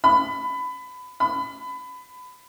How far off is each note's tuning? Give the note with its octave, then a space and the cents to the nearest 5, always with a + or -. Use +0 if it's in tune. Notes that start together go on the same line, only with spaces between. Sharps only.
B5 +20
B5 +25